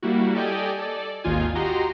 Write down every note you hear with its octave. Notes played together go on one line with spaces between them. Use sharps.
G3 A#3 E4 F#4
G4 A4 D5 D#5 G5 G#5
A4 D5
G#1 D#2 D#4 F4 G#5
F#4 G4 D#5 A#5 C6